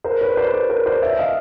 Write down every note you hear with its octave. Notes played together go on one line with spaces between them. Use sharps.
A#4 C5
B4 C#5
C5 D5
C5 D5
A#4 C5
C5 D5
D5 E5
D#5 F5